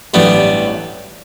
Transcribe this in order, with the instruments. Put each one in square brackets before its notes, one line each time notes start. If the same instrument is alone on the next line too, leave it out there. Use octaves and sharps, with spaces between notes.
[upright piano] A1 G2 F#3 A3 [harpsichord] G3 B3